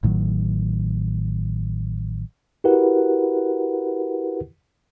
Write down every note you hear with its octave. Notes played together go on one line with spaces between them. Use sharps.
A1 A2 D#3 F#3
E4 F#4 G4 A#4 B4 F#5